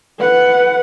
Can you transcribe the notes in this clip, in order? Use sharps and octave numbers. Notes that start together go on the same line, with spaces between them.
B4 F#5